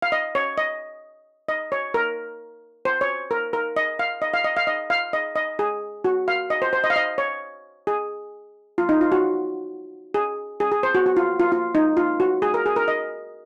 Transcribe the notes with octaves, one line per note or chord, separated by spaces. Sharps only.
F5
D#5
C#5
D#5
D#5
C#5
A#4
C5
C#5
A#4
A#4
D#5
F5
D#5
F5
D#5
F5
D#5
F5
D#5
D#5
G#4
F#4
F5
D#5
C5
C5
D#5
F5
D#5
C#5
G#4
F4
D#4
F4
F#4
G#4
G#4
G#4
C5
F#4
F#4
F4
F4
F4
D#4
F4
F#4
G#4
A#4
G#4
A#4
D#5